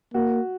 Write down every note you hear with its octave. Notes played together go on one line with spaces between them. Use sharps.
A#3 F#4